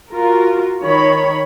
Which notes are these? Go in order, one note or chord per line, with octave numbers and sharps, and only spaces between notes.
F4 F#4 A#4
D#3 C#5 B5